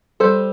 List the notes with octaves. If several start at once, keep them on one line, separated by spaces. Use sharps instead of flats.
G3 A4 C5